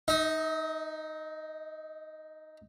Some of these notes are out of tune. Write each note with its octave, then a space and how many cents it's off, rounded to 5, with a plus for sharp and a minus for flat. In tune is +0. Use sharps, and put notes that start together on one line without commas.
D#4 +0 D#5 +45